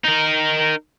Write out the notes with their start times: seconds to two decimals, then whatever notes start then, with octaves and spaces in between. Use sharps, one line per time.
0.05 D#4 A#4